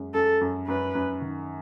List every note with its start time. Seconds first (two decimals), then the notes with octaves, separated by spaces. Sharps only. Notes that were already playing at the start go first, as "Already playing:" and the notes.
Already playing: F#2 G#3
0.14 F#2 A4
0.41 F#2
0.67 F#2 B4
0.95 F#2
1.21 D#3